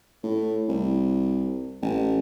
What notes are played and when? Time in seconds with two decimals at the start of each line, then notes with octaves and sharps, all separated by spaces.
0.23 A2
0.69 C2
1.82 A1